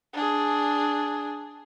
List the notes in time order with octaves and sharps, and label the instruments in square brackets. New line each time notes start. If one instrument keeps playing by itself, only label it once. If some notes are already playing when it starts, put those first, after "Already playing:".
[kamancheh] D4 G#4